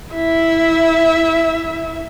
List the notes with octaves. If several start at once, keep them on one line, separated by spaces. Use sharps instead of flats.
E4 E5